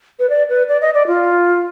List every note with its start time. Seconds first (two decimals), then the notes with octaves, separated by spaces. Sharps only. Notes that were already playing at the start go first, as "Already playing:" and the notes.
0.19 B4
0.30 D5
0.50 B4
0.69 D5
0.81 D#5
0.94 D5
1.07 F4